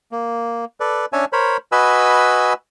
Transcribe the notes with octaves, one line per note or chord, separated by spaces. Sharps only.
A#3
A4 B4 D5
C#4 D4 C#5 E5 G#5 A5
A#4 C5 C#5 B5
F#4 B4 D#5 G#5 B5 E6